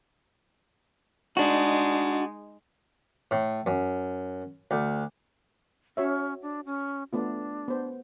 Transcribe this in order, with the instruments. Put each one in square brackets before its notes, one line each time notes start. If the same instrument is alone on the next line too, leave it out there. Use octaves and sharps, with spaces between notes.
[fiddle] G#3 D#4 [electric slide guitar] D4 F#4
[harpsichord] A2
F#2
D2
[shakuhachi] C#4 [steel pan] F#4 C#5 E5
[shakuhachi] D4
C#4
[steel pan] A3 B3 F4 [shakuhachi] D4
[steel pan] B3 C5